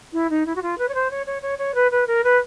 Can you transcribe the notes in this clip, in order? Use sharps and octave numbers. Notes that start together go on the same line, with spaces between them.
E4
D#4
E4
F#4
F4
B4
C#5
C5
C#5
C#5
C#5
C#5
B4
B4
A#4
B4